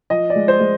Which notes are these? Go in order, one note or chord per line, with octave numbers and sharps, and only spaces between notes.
F3 D#5
D5
G#3
C5
G#3